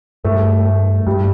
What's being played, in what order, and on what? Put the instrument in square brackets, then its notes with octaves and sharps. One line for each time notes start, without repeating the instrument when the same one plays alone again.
[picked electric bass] G2 [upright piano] A3
[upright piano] A3
[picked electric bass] G2 [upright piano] G3